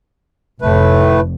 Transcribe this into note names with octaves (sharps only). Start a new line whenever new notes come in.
F1 A2 A3 B4